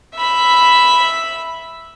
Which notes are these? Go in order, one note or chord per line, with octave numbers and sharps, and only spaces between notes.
E5 B5